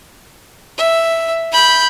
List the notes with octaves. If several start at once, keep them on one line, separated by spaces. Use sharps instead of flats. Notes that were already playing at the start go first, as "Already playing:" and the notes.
E5
B5 G6